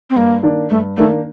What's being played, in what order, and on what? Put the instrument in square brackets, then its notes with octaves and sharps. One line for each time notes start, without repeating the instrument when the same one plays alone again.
[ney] C4
[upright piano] G2 [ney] A#3
[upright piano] D#3 A#3 D4
[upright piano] G2 [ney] A3
[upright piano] D#3 A#3 D4 [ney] A3